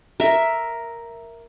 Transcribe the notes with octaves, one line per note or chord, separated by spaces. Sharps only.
A#4 E5